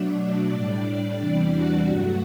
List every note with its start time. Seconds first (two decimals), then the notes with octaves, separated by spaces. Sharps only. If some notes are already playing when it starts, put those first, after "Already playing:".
Already playing: B2 F#3 A3 D4 D5
0.52 A2 G3
1.19 E2 C3 E3 G3 D4 D5
1.53 F#4 F#5
1.87 G2 F#3 A3